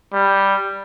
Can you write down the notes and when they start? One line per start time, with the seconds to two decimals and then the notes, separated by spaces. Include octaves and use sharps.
0.13 G3